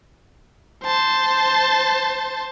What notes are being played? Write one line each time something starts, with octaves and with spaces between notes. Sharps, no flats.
C5 A5